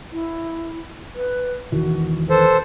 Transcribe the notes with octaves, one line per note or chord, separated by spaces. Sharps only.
E4
B4
E1 D#3 E3 F#4
A4 B4 C5